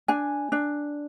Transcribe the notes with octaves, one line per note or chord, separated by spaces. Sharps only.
D4 G#5
D4